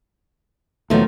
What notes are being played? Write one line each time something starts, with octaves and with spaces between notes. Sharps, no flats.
D#2 B2 D#3 F3 F#3 A3